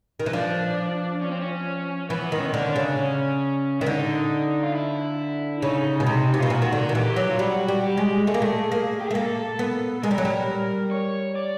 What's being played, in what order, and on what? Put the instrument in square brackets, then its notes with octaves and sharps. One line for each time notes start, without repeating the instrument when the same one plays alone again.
[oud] D#3
[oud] E3 [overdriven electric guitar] D#4
[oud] F3 [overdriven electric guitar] D4
[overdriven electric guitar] C#4
C4
C#4
[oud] E3 [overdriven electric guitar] B3
[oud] D#3
[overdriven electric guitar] C#4
C4
[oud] D3 [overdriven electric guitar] C#4
[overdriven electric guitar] D4
[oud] C#3
[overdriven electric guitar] C#4
[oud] D#3 [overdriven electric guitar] E4
[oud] D3 [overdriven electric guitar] D#4
[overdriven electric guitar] F4
E4
[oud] C#3 [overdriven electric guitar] D#4
[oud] B2
C3
C3
[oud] B2 [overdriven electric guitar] F4
[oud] A#2 [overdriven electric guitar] F#4
[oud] D#3
D3
D#3
[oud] E3 [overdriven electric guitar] G4
[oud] F#3
[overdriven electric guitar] F4
[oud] G3 [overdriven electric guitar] F#4
[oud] G3
[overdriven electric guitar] G4
[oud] G#3
[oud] A3 [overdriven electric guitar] G#4
[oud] A#3
A3
A#3
[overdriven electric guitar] G4
G#4
[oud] A3
[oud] A#3 [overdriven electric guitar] A4
[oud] B3
[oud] G#3 [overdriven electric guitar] A#4
[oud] G3
F#3
G3
[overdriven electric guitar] C#5
D5